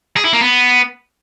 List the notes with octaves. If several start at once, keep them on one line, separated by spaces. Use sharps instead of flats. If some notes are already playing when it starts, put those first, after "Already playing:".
G#4
E4
A#3
B3